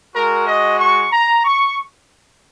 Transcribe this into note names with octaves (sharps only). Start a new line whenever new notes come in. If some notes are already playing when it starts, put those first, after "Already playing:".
G#3 F#4 A#4
D#5
C#6
A#5
C#6